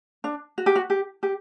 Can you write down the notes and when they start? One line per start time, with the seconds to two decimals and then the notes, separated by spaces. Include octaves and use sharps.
0.24 D4
0.58 F#4
0.66 G4
0.76 F#4
0.90 G4
1.23 G4